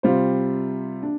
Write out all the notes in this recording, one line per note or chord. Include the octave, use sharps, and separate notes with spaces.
C3 G3 F4 C5
D4